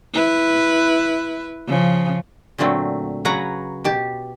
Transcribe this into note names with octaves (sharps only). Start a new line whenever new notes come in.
E4 B4
C#3 F3
A#2 D3 F#3 A3 C4
C#3 F#3 B4 C#5 F#5 A#5
B2 G4 A5